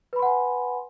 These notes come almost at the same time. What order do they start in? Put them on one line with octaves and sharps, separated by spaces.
B4 B5 C6 F#5 G#5